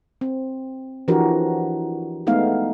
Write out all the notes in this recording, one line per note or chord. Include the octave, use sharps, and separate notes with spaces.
C4
E3 F3 D4 F#4 G4 A#4
G#3 A3 B3 D#4 F5